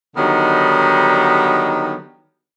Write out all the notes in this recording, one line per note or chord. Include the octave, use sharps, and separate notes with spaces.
D3 D#3 F#3 G3 B3 D#4